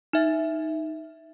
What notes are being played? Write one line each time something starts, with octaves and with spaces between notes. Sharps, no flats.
D#4 E5